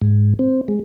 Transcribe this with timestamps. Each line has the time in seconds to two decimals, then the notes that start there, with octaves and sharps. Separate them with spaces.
0.02 G#2
0.39 C4
0.68 G#3